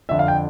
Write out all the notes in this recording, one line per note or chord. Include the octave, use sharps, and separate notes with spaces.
F2 D3 E5
F5
G5